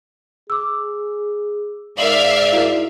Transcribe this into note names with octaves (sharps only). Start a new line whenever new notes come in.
G#4 D6 E6
G#2 A#4 D5 E5 F5 F#7
E4 F#4 A#4